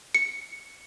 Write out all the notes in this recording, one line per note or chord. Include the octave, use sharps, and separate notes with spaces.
C#7